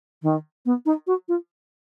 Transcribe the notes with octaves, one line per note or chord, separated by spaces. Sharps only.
D#3
B3
D#4
F#4
F4